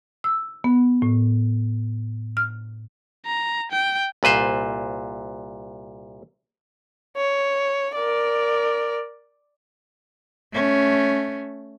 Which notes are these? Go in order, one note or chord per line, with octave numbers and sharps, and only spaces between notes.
E6
B3
A2
F6
A#5
G5
C2 A#2 B4 C5
C#5
A#4 D5
A3 C#4